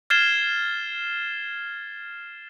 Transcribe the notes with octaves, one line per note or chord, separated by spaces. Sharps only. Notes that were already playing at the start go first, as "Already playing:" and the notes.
F6 G#6 A6 C7 E7 G7